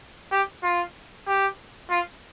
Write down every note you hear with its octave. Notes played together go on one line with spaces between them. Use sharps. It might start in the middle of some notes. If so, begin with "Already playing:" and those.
G4
F4
G4
F4